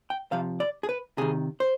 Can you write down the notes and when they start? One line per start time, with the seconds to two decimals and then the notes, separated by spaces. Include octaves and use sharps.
0.10 G5
0.32 C3 F3 F5
0.60 D5
0.83 G#4
0.89 B4
1.18 C3 D#3 G#4
1.60 C5